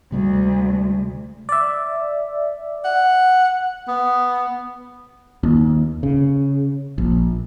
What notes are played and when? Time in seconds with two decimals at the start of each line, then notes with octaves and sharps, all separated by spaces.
0.12 D2 C3 G3 G#3
1.49 D5 E5
2.85 F#5
3.88 B3
5.43 D#2
6.03 C#3
6.98 A#1